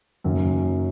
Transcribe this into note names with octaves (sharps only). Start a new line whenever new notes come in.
F#1 F#2 D#3 F#3 C#4